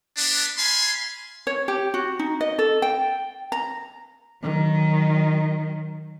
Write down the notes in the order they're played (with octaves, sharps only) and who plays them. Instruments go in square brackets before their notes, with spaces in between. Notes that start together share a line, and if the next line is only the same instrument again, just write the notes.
[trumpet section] B3 D4
F5 G#5 B5 C6
[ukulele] C#5
G4
F#4
D#4
D#5
A4
G5
A#5
[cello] D#3 F#3